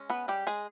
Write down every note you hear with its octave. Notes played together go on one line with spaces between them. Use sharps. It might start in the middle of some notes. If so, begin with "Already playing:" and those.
Already playing: G#3 C#4
B3 B4
G3 G4
G#3 G#4